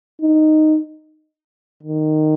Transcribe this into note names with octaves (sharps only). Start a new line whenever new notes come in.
D#4
D#3